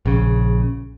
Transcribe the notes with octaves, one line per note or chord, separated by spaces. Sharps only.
A#1 C#3